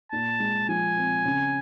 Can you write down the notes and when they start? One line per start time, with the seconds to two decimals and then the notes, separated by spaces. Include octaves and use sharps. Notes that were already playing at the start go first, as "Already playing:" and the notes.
0.12 A#2 A5
0.40 G#3
0.69 F3 G#5
0.97 C4
1.25 C#3